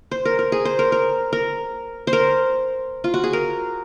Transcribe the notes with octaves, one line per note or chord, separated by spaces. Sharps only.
C5
A#4
A#4
G#4
C5
A#4
A#4
A#4
C5
A#4
F4
F#4
G#4
A#4